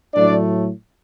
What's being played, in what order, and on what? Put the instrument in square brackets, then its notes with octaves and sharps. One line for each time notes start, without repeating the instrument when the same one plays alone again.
[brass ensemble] A2 F#3 A3 D4 D5